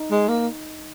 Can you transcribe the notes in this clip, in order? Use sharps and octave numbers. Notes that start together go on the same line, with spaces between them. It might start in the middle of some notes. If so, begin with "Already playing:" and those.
Already playing: D#4
G#3
A#3